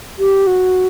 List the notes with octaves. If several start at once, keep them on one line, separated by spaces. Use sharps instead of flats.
G4
F#4